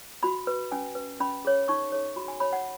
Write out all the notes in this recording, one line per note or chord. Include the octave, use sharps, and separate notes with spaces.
F#4 B5
B4
C#4 G#5
B4
C#4 B5
G#4 C#5
D#4 C#6
G#4 C#5
F#4 B5
G#5
C#5 B5
F#5